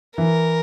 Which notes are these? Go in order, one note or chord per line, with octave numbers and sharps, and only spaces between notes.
E3 A#4